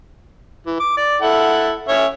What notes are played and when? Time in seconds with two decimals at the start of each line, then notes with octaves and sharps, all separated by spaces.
0.66 E3
0.80 D6
0.97 D5
1.22 E4 A4 F#5
1.88 C#4 C#5 E5